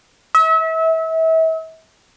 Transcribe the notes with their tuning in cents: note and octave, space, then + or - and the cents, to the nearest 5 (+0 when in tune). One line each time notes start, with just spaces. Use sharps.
E5 -35